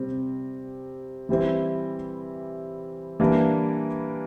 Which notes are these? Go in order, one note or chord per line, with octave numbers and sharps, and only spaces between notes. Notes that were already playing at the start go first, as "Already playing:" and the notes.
Already playing: C3 G3 C4
E3 G3 C4 E4
E3 G3 A#3 D4